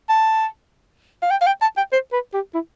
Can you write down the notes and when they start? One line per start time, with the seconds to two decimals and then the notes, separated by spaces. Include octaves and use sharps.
0.09 A5
1.22 F5
1.31 G5
1.42 F5
1.47 G5
1.62 A5
1.77 G5
1.92 C5
2.13 B4
2.34 G4
2.55 E4